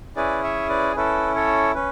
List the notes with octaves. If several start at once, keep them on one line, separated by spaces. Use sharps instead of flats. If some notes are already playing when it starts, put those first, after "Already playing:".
C#4 E4 G#4 B4 D5
C#5 E5
B4 D5
C#4 E4 A4 B4
A4 C#5
C#4 B4